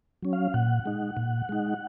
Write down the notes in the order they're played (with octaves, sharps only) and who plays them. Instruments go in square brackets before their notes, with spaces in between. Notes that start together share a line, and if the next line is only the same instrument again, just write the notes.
[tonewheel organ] F#3 C#4
F5
A#2 F#5
G#3 D#4
A#2
G#3 D#4